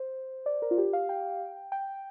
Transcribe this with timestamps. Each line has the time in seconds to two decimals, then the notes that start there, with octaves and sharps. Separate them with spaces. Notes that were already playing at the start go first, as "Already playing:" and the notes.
Already playing: C5
0.46 D5
0.62 A#4
0.71 F4
0.78 G4
0.93 F5
1.09 G5
1.72 G5